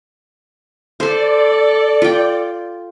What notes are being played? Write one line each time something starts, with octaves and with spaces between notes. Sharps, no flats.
A4 C5 D5 C6
F4 G5